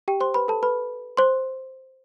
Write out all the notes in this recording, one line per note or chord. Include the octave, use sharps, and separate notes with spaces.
G4 G5
C5 C6
B4 B5
A4 A5
B4 B5
C5 C6